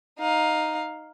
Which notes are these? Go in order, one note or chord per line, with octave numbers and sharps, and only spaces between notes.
D#4 F5